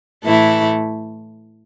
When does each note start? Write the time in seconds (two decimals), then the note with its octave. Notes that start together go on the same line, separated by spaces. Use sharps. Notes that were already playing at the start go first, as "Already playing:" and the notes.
0.23 A2 E3 A3 E4